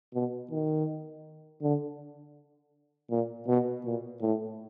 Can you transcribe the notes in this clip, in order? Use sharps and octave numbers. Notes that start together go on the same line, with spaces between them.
B2
D#3
D3
A#2
B2
A#2
A2